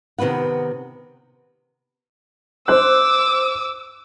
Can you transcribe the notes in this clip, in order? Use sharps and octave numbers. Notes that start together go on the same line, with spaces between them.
C3 D#3 B3 B4 F#5
C5 D6 E6 F#6